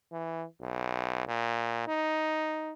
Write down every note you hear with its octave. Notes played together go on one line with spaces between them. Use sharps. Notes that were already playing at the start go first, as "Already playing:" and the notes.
E3
B1
A#2
D#4